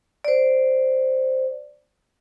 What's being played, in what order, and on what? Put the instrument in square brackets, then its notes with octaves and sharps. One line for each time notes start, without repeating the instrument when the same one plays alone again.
[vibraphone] C5 D5